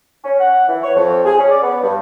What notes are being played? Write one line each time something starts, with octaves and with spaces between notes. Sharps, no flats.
C#4
F#5
E3
C#5
F2
G#4
C#4
D5
B3
G2